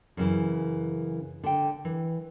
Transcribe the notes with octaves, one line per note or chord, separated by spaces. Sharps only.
F#2 C#3 E3
D3 G5
E3